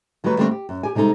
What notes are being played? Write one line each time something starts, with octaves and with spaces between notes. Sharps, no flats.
D#3 F#3 G3 A3 B4
D3 G3 A3 A#3 C4 D4
G4
F#2
G4 G#5
C3 G3 G#3 D#4 A4